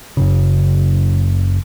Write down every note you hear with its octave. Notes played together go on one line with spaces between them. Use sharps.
F#1 C#3